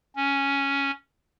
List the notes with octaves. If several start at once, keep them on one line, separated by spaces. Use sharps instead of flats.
C#4